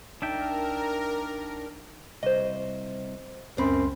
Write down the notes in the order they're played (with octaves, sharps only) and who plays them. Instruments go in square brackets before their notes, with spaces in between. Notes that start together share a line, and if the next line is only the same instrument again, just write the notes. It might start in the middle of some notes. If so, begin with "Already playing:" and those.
[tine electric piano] C2 D#4 A5 [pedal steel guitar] D4 E5 G5 [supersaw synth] A#4
[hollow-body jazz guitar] C2 [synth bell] C5 D#5
[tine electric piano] C#2 B5 C6 [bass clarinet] F#2 [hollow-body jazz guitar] C4